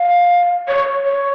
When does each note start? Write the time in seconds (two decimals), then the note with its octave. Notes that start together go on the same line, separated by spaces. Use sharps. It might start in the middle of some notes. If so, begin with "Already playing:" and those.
Already playing: F5
0.68 C#5
1.05 C#5